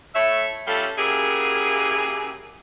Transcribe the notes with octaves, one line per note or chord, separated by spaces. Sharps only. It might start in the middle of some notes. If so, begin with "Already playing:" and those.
A3 E4 C#5 E5
G3 A3 C#4 F4 A4
C#3 F#3 A#3 E4 G4 G#4